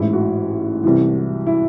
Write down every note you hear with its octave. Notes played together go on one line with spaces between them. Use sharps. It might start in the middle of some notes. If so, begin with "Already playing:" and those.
Already playing: A1 G#2 E3 E4
F#4
C2 C3 E3
E4